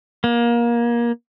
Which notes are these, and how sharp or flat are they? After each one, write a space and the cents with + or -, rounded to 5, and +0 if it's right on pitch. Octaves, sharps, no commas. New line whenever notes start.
A#3 +25